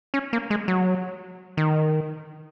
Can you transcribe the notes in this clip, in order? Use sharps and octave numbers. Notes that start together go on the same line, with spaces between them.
C#4
A#3
G#3
F#3
D#3